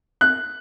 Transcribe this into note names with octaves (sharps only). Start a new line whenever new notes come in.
F#6